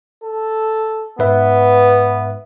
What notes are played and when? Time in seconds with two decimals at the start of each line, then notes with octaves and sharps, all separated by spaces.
0.24 A4
1.19 G#2 B3 B4 E5